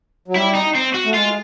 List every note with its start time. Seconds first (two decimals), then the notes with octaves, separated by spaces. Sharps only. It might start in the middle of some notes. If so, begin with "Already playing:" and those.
0.28 F#3
0.35 G3 E4
0.55 D#4
0.75 C4
0.94 F#4
1.05 A3
1.14 G#3 F4